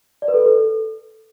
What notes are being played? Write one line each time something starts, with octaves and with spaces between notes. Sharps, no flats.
D5
B4
A4
B4
A4